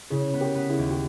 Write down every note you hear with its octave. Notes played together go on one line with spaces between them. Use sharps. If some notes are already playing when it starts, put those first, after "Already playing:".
C#3 E4 G#4
B3
G4 A#4
B3
E4 G#4
D#2
G4